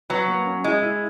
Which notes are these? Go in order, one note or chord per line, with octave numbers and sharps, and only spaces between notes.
F#3 B4
A#3
C#4
G#3 E4
E4